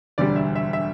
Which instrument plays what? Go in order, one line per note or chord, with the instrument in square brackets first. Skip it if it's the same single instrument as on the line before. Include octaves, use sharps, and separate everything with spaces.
[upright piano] E1 D2 D3 G3 D5
E5
E5
E5